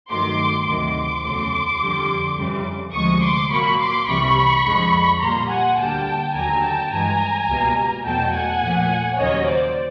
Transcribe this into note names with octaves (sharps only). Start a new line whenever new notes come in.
G2 D#3 F#3 A3 C6 D6
D2 C3 D#3 F#3 C6 D6
E2 C#3 F#3 A3
F2 D3 G3
F2 C#3 E3 G3
D2 C3 F3 G#3 C#6 D#6
C6 D6
A#2 F#3 A#3 B5 C#6
C6 D6
C2 C3 E3 G3 B5 C#6
F2 D3 F3 G#3
A#2 G3 A#3 A#5 C6
F#5 G#5
D2 D3 G3 A#3 G5 A5
D#2 D3 F#3 A#3 G#5 A#5
G5 A5
G2 E3 G#3 G#5 A#5
C#2 B2 G3 A#3
E2 B2 F#3 A3 G5 A5
F#5 G#5
A#2 F3 A3
D#2 C#3 F#3 A#3 C#5 D#5
C5 D5